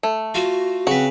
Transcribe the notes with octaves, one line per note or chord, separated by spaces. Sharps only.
A3
F4 F#4
C#3 C4 F#4 B4